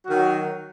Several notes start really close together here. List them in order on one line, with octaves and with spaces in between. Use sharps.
F#4 D#3 F#3